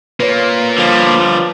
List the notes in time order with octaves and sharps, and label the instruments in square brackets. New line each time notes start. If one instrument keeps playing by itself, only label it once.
[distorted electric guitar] A#3 F4 [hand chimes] B4 C#5
[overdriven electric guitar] D3 G3 [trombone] F3